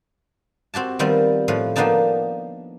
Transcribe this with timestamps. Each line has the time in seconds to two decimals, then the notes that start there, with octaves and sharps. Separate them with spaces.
0.74 C4 F#4 G4 A5
0.99 D#3 F3 G3 B3 C4
1.48 A2 F3 B4
1.76 F3 A#3 B3 D4 D#4 A5